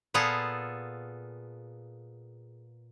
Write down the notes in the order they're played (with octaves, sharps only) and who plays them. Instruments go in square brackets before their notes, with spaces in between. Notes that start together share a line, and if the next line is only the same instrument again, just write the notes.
[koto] A#2 B3 F4 G#4 A4 A5